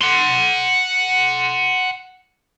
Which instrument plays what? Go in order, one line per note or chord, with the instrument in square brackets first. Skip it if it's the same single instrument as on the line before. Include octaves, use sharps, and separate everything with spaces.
[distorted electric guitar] F#5 C6